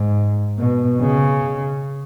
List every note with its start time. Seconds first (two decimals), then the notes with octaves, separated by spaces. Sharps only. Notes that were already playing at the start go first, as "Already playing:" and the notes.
Already playing: G#2
0.59 B2
1.01 C#3